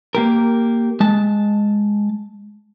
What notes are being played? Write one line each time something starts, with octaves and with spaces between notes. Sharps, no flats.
A#3 G4 A#4
G#3 A5